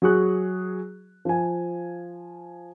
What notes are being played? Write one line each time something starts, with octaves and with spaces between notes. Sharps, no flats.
F#3 F#4 G#4 C#6 F#6
F3 G#5